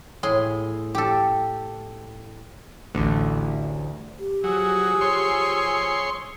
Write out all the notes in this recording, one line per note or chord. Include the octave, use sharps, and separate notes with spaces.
A2 G#4 C6
G4 A4
A1 D2
G4
F3 F#3 G#4 G#5 E6
C#5 C6